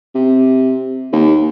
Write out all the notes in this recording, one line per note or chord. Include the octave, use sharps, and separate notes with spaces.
C3
D#2